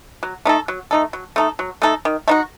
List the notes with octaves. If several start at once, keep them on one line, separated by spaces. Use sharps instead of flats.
F#3
A3 D#4 A4
F#3
A3 D#4 A4
F#3
A3 D#4 A4
F#3
A3 D#4 A4
D#3
A3 D#4 F#4